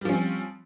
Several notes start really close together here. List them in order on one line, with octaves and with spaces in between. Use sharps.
G3 F3 C#4 C4